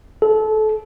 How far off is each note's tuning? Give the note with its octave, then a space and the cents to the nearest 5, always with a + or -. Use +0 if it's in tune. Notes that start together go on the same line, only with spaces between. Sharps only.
A4 -25